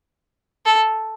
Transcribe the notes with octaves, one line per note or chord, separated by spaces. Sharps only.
A4